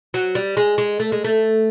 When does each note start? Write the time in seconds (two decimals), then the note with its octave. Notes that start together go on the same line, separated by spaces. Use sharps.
0.14 F#3
0.35 G3
0.57 G#3
0.78 G#3
1.00 A3
1.12 G#3
1.24 A3